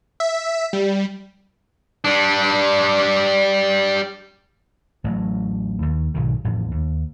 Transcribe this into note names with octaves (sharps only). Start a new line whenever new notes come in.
E5
G3
G3 D4
A1 A2 F#3
D#2
B1 G#2 D#3
A1 F2
D#2